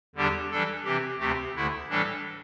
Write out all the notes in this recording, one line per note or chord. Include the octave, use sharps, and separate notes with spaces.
E2 D3 G3 D4 G4
E3 G3 D4 A4
C3 E3 C4 G4
D2 C3 A3 C4 G4
D2 D3 A3 E4
A2 E3 G3 D4 A4